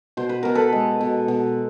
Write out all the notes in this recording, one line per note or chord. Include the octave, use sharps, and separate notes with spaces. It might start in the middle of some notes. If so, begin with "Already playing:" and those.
B2 C5
B4
B2 A#4
A4 B4
G#3
B2
B2